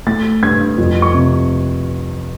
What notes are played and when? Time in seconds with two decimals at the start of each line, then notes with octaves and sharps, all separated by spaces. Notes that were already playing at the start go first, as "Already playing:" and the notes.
0.07 A3 A6
0.43 G2 G#6
0.78 F2
1.02 C#6
1.14 C3